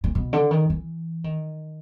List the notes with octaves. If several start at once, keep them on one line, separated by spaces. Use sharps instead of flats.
A#2
B2
D3
D#3
E3
D#3